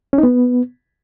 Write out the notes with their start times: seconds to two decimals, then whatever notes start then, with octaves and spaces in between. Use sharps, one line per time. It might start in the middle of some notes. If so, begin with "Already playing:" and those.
0.13 C#4
0.18 D#4
0.23 B3